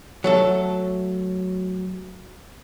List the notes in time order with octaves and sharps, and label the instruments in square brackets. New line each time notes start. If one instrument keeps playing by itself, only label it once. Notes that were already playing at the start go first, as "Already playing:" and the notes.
[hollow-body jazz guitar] F#3 A3 A4